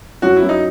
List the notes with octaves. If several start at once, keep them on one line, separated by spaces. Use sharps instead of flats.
F#2 F#4
E4
F#2
D#4